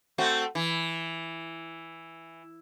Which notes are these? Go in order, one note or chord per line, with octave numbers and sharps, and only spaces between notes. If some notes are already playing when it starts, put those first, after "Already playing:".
A3 C4 F#4
E3